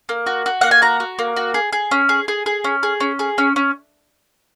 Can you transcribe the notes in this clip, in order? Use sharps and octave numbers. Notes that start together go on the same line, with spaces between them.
A#3
F#4
F#4
A#3 F#5
G#5
F#4 A#5
F#4
A#3
F#4
G#4
G#4
C#4
G#4
G#4
G#4
C#4
G#4
C#4
G#4
C#4
C#4